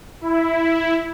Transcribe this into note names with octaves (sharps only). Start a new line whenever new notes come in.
E4